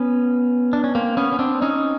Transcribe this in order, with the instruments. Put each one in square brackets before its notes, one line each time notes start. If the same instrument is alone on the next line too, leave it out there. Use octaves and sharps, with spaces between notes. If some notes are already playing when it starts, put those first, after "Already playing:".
Already playing: [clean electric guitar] B3 C#4
D4
C#4
A#3 C4
B3 C#4
C#4
C4 D4
C#4 D#4